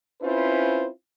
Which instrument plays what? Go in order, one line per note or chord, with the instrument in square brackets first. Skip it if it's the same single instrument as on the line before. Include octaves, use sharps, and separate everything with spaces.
[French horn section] C4 C#4 E4 F4 B4 C5